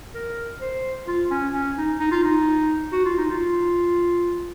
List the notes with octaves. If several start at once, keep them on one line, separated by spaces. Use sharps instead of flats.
A#4
C5
F4
C#4
C#4
D#4
D#4
F4
D#4
F#4
F4
D#4
F4